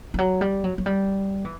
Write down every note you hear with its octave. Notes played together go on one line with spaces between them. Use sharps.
E3
F#3
G3
F#3
F#3
G3
E3